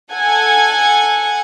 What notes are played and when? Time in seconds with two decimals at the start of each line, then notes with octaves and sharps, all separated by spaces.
0.13 A4 F#5 G#5 G#6